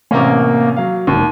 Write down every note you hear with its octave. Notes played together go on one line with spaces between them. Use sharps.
A1 C3 A#3 C#4
F#3 F5
E1 D#2